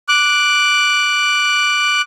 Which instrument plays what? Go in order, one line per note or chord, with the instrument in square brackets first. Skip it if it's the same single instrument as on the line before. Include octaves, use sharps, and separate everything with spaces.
[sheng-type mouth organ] D6 F#6